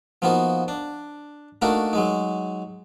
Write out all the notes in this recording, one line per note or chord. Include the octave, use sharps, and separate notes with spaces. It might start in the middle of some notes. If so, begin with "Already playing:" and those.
F3 A#3 B3 D#4 F#4
D4
A3 A#3 D4 D#4 F#4 A#4
F#3 G#3 D#4